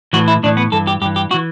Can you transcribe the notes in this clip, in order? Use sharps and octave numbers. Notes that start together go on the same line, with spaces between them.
A2 E3 F#4
E4
A2 E3 D4
B3
G2 E3 A4
G4
G2 E3 G4
G4
F#4
E3